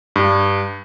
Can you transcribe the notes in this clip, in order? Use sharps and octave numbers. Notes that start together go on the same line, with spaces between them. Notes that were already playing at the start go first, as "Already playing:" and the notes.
G2